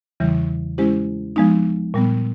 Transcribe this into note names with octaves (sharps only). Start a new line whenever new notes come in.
E2 C#3 E3 G3
G#3 C#4 E4 G4 C5
F3 G#3 B3 D#4
A#2 G3 B3